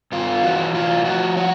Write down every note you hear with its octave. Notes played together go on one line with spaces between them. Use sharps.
G2 F4
E3 F#4
A2 F4
F3 F#4
F#4